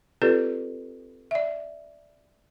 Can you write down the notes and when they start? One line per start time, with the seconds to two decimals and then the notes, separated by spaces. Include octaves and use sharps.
0.22 C4 F4 G4 A4 B4 D5
1.31 D5 E5